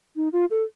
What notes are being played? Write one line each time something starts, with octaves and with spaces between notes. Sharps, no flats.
D#4
F4
A4